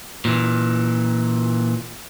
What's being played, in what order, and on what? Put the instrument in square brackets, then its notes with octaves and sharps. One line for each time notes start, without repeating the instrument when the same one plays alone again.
[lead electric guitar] A#2 E3